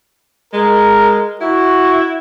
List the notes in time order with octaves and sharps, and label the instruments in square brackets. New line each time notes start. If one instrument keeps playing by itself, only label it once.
[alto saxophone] G#3 [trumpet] A#4
[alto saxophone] E4 [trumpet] F#4